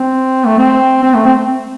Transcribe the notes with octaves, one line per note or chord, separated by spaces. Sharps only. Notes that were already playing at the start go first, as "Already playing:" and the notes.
Already playing: C4
A3
C4
C4
A3
C4